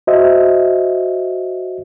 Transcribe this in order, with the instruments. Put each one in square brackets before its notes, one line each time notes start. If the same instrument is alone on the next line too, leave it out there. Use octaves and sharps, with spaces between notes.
[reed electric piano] F#4 C5 D#5 E5